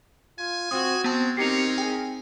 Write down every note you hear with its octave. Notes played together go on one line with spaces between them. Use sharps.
F4 G#5
C4 F#4 D#6
G#3 B3 C4 A5
C4 C#4 D#4 G4 A#4 C7 C#7 F7
G#4 G5